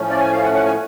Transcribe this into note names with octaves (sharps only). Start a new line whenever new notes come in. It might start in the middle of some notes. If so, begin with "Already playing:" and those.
Already playing: A2 F3 A3 C#4
D5
G#5
F5
F#5
F#5
G#5